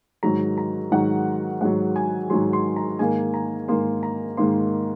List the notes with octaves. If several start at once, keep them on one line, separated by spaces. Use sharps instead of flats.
G#2 D#3 F#3 A#5
A#5
G#2 D#3 F#3 F#5
G#2 D#3 F#3 F#5
G#5
G#2 D#3 F#3 C6
C6
A#5
G#2 D#3 A#3 G#5
A#5
G#2 D#3 A#3 C6
A#5
G#2 D#3 A#3 C6